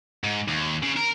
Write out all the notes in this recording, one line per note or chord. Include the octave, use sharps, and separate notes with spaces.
G#2
D#2
C#3
A#4